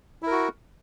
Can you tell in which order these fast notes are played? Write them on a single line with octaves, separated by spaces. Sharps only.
E4 A#4 F#4